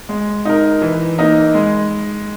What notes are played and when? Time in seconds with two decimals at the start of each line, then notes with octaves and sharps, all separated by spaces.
0.09 G#3
0.45 D#4 A#4
0.82 E3
1.18 A#3 D#4 A#4
1.54 G#3